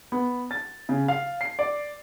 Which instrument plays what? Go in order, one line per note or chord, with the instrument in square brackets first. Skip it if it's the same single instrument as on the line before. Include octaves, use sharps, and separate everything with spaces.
[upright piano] B3
A6
C#3
F5
C7
D5